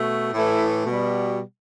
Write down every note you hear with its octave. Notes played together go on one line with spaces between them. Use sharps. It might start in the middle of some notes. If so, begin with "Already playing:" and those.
Already playing: B2 A3
A2 E3 A3 E4
B2 G3